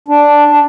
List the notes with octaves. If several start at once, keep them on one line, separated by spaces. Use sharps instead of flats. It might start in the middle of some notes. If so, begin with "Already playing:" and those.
D4
D4